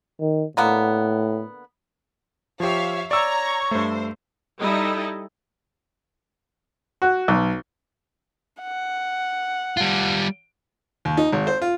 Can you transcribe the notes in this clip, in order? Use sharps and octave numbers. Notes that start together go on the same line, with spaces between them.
D#3
A2 D3 A#3 B3
F3 G4 C#5 E5 F5
C#5 D5 A#5 C#6 E6
G2 A3 C5
G3 D#4 E4 A4 D#5
F#4
B1
F#5
G3 F4
D#2
D#4
G#1
C5
F4